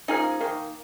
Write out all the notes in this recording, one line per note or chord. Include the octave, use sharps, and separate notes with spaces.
C#3 F3 A#3 D#4 G#4
D#3 A#3